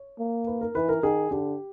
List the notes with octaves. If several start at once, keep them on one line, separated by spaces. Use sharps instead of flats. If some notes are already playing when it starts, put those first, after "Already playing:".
Already playing: C#5
A#3
B4
A#4
E3 B4
A#4
D#3 G#4
D3 G4